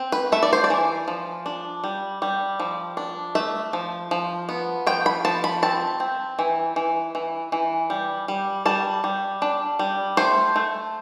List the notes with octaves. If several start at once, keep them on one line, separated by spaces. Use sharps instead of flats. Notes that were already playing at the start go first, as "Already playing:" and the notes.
Already playing: C4
B4
A3 E5
D5
C5
D5
E3
F3
D4
G3
G3
F3
D4
A3 E5
F3
F3
B3
F3 G5
B5
F3 A5
B5
C4 A5
C4
E3
E3
E3
E3
G3
G3
G3 A5
G3
D4
G3
A3 C5
A3